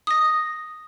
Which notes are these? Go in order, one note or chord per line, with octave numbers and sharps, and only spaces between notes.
D#6 A#6